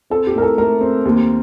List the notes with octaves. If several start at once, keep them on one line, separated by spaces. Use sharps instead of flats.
C4 A4
G4
A2 A#4
A4
A3 A#4
C4
D#2